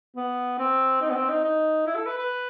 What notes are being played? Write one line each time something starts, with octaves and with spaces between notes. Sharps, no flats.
B3
C4
D#4
B3
C4
D#4
D#4
E4
A4
B4
B4